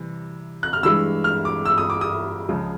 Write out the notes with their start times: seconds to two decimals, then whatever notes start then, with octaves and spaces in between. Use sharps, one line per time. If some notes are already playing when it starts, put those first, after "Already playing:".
Already playing: C3 E3 G3
0.63 F#6
0.73 F6
0.83 G2 E3 G#3 E6
1.24 F6
1.45 D6
1.65 E6
1.78 D#6
1.90 D6
2.01 D#6
2.49 C#2 C#3 F3 G#3